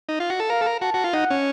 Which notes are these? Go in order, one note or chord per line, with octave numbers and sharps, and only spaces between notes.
D#4
F4
F#4
A4
A#4 F5
A4
A#4
F#4 A5
F#4
F4
D#4 F#5
C#4